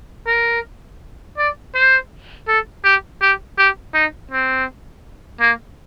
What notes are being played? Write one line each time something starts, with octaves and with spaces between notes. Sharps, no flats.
A#4
D5
C5
A4
G4
G4
G4
D#4
C4
A#3